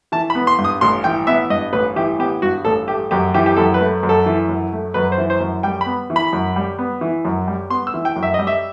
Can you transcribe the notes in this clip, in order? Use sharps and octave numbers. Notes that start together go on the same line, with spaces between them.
E3 A5
B5
B3
C6
G2
D#6
A1 C6
E3 G5
B3 E5
G2 D#5
A1 B4
E3 G4
B3 G4
G2 F#4
A1 A4
A3 G4
F#2 G4
E3 G4
G4
F#2 A4
B4
A3
F#2
A4
E3
F#2
A3
F#2 B4
C5
E3
C5
F#2
G3 G5
B5
B3
E3
B5
F#2
G3
B3
E3
F#2
G3
B3 C6
E6
E3
G5
F#2
E5
G3 D#5
E5